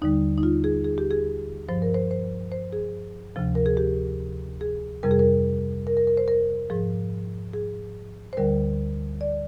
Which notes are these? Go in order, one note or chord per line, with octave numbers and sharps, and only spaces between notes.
D#2 D3 G3 D#4
D#4
F4
G#4
G#4
G4
G#4
G2 F3 C5
A#4
C5
C5
C5
G#4
D2 C3 F3
A#4
G#4
G4
G#4
F2 C3 G3 A#4
G#4
A#4
A#4
A#4
A#4
C5
A#4
G#2 F3 G#4
G#4
C5
D2 D3 G3 A#4
D5